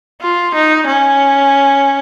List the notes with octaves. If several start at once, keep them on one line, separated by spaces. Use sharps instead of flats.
F4
D#4
C#4